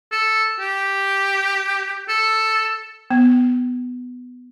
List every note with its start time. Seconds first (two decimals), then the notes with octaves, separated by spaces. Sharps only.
0.12 A4
0.60 G4
2.09 A4
3.11 B3